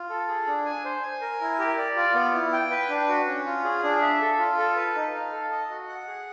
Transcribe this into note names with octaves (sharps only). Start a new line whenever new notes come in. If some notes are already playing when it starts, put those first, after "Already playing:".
Already playing: F4
A4
G#4
D4
G#5
C5
G#5
A#4
E4
G4
D5
F4
B3
E4
G5
B4
D4
F#4
C#4
F4
G#4
D4
E5
A4
F4
A4
B4
D#4
F5
A4
D#5
F#4
F#5
G#4